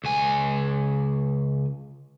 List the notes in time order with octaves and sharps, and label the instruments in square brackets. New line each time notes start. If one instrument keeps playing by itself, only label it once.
[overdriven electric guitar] C#2 G#5